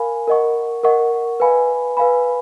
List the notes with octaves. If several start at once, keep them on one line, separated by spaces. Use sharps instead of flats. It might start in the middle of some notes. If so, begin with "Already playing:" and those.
Already playing: A#4 F5 G#5 B5
A#4 D#5 F#5 C#6
A#4 D#5 F#5 C#6
B4 F5 G#5 B5
B4 F5 G#5 B5